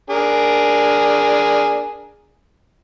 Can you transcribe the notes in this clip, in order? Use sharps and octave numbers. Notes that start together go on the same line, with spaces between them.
D4 G#4 A#4